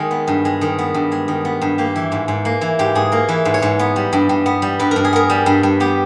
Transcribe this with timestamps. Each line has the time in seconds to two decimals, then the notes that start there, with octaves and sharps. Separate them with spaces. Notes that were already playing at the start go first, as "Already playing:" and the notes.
Already playing: D#3 G#3 A#4
0.11 B3
0.28 G2
0.45 G#3
0.61 D#3
0.79 B3
0.94 G2
1.12 G#3
1.28 D#3
1.45 B3
1.62 G2
1.78 A#3 G4
1.96 E3
2.12 G#2
2.28 G#2
2.45 A#3
2.61 E3
2.79 G#2 G4
2.95 G#2 G#4
3.12 A#3 A#4
3.29 E3 B4
3.45 G#2
3.54 C#5
3.62 G#2
3.79 B3
3.96 G3
4.13 G2
4.29 G2
4.46 B3
4.62 G3
4.79 G2 B4
4.91 G2 A#4
5.04 G#4
5.13 B3 A#4
5.30 G3
5.46 G2
5.63 G2
5.80 B3 G4